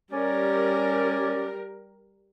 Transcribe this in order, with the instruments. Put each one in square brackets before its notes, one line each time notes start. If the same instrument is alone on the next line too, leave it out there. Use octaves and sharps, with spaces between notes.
[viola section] G3 A#4 [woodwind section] C#4 D5